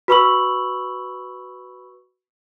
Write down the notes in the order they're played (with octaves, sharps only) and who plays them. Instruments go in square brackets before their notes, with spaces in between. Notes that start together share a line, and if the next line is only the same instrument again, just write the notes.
[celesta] F#4 B4 B5 C#6 E6 F#7